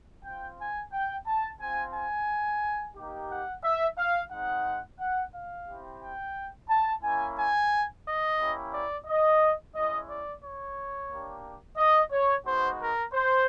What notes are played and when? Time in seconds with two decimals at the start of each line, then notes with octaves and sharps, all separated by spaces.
0.25 C4 F4 G5
0.59 G#5
0.93 G5
1.27 A5
1.60 C4 F4 G#5
1.94 G#5
2.96 A#3 D#4 G4
3.30 F#5
3.64 E5
3.98 F5
4.32 G#3 C4 D#4 F#5
5.00 F#5
5.33 F5
5.68 C4 E4 G4
6.02 G5
6.69 A5
7.03 A#3 C#4 E4 G#5
7.37 G#5
8.05 D#5
8.39 A#3 C#4 E4 G4
8.73 D5
9.07 D#5
9.75 G#3 C#4 E4 D#5
10.08 D5
10.43 C#5
11.11 A#3 D4 G4
11.78 D#5
12.12 C#5
12.46 G#3 B3 D#4 F#4 C5
12.81 A#4
13.14 C5